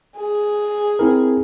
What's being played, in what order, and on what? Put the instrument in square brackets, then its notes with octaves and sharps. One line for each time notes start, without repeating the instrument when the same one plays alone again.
[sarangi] G#4
[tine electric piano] C4 E4 A#4